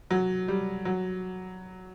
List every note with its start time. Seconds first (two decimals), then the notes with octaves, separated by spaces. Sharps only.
0.11 F#3
0.48 G3
0.85 F#3